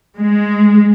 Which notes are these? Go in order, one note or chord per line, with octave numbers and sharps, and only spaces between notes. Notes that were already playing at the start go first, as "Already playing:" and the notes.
G#3